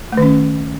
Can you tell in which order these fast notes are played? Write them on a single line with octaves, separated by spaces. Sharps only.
A3 D#3 C#4